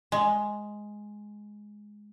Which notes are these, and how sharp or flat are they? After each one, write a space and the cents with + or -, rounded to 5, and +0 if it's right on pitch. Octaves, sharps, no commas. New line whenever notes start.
G#3 +5